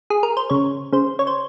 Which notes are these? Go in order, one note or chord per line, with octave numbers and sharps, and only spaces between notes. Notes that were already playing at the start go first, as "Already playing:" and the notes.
G#4
A#4
C5
C#3 C#5
C#3 C5
C#5
C5